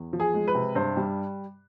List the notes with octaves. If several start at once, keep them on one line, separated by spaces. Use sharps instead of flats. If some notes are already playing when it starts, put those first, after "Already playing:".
Already playing: E2
F3
G#4
G#3
B4
C3
G2 C5
G3